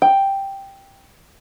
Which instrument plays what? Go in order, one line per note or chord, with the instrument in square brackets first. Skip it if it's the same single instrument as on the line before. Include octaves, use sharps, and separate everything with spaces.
[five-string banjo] G5